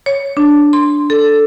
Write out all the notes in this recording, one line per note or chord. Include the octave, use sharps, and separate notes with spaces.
C#5
D4
C6
A4